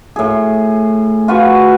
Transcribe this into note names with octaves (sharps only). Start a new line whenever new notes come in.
A2 G#4
F4 F#4 B4 C#6